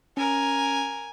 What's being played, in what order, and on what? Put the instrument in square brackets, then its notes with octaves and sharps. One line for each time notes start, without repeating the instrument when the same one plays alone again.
[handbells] C#4 [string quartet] A#4 [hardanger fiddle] G#5